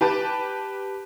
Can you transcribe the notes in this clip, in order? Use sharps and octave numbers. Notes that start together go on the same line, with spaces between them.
G4 B4 A5